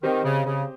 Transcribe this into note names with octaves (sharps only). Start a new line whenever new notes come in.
D#3 C4 G4 C5 D#5
C#3
C#3